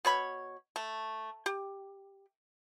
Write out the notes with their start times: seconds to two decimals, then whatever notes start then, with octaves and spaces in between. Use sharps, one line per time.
0.05 B2 C#5 B5
0.76 A3
1.46 G4